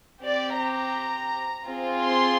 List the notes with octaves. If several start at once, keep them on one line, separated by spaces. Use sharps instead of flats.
C4 G4 D5
A#5
C4 F4 G#4
C6